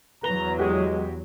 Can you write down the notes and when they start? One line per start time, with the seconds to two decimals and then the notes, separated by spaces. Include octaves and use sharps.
0.23 E2 F#3 B4 A#5 G7
0.58 G#3 F#4 G4